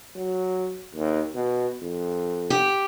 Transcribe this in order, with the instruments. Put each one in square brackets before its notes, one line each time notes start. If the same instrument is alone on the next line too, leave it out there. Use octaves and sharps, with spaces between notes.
[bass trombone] F#3
D#2
B2
F2
[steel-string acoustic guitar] G4